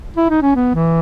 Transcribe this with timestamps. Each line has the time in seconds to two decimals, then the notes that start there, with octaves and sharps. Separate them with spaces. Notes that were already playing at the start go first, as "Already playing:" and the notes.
0.17 E4
0.30 D#4
0.43 C#4
0.56 B3
0.75 E3